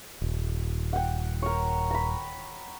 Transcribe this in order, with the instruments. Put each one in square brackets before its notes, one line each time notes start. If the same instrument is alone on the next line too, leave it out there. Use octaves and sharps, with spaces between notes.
[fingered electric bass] D#1
[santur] F#5 G5
A#4 C#5
A#5 B5